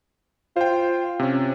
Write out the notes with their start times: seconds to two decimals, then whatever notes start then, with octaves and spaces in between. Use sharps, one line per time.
0.56 F4 C5 G5
1.19 C3 C#4